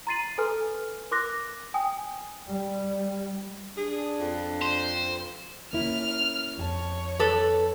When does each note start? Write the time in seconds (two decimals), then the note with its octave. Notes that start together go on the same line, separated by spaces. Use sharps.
0.07 A#5 C6 A6 C7 D#7 F#7
0.38 A4 B4 G#5 C6 F6
1.11 A#4 C6 D6 F#6 A#6
1.74 G5 G#5 D#6
2.47 G3
3.78 D4 G#4
4.20 F2
4.61 C5
5.73 A#3 C#4 E4 F6
6.58 F2 C#5 G#5 A5
7.19 A4 B4